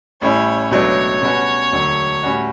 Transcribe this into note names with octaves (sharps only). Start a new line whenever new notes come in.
A1 A2 G3 C#4 E4 C#5
C#2 B2 F#3 A3 D4 C#5
B2 G3 C#4 F#4
E1 D2 D3 F#3
A2 G3 C#4 F#4